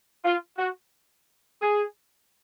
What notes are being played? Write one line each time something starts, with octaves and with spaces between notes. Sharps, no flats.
F4
F#4
G#4